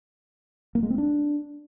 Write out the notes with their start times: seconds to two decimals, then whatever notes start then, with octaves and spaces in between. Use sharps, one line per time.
0.75 A#3
0.83 G#3
0.90 C4
0.98 D4